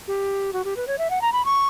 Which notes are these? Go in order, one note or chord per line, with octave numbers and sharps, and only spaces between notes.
G4
F#4
G4
B4
C#5
E5
F#5
A#5
B5
C#6